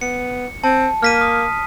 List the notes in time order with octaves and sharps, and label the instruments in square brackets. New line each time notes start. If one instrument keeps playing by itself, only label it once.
[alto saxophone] B3 [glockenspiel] C#7
[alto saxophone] C4 [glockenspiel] A5
[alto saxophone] A#3 [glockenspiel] F6 B6 D#7
[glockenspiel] D#6